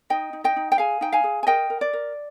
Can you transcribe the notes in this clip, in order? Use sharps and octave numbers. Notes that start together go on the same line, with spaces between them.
D#4 D#5 G5
D#4
D#5 G5
D#4
G5
G#4 F5 G#5
D#4 G5
F5 G#5
G#4
G#5
A#4 D#5 G5
A#4
D5
A#4